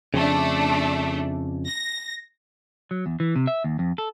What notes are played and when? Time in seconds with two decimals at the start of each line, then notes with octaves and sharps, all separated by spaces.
0.14 F2 C#3 A3 D4
1.66 A#6
2.91 F#3
3.06 E2
3.20 E3
3.36 C3
3.47 E5
3.64 D#2
3.79 F2
3.98 A4